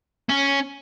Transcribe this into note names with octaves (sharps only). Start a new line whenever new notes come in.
C#4